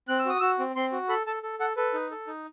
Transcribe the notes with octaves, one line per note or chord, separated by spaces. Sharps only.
C4 F#6
E6
F#4 D#6
F#4 E6
C4
C4 C6
F#4
A4 B5
A4 A5
A4
A4 F#5
A4 B4
D#4
A4
D#4